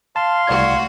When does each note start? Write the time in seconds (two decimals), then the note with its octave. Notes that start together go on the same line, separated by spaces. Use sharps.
0.16 F5 A5 C6
0.47 C2 A3 F#4 D5 G#6